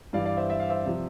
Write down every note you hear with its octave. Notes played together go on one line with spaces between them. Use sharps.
G2 E3 D5 F5
D5 F5
C5 E5
E5
F5
C5 E5
C3 F3